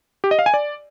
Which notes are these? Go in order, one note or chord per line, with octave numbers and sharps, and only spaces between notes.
G4
D#5
F5
G#5
D5